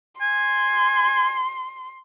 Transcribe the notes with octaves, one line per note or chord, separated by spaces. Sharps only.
G#5 C6